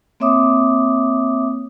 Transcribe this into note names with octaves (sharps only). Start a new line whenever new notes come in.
A#3 C4 C#5 E5 D6 D#6